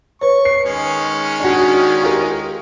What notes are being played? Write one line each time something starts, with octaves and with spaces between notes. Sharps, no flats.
B4 C#5 C#6
C7
D#3 G#3 C#4
D4 F#4
F4 G4 A#4